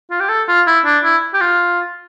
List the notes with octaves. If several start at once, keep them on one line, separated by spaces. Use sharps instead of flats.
F4
G4
A4
F4
E4
D4
E4
G4
F4